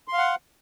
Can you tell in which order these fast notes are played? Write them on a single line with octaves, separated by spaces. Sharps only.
C6 F5 F#5